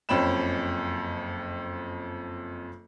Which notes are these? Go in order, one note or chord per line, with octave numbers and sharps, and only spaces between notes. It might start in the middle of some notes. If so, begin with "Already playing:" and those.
F#1 F2 C#4 G5 B5 E7